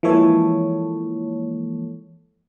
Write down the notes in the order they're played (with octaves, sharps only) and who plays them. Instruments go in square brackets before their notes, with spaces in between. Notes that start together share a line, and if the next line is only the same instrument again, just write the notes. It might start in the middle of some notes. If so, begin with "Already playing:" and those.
[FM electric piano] E3 F3 G#3 A#3 A4 C#5